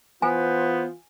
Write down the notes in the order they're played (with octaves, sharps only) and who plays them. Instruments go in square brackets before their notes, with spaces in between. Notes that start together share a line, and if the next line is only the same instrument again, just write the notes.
[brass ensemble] E3 F4 [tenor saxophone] B3 [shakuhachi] C5 [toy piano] G#5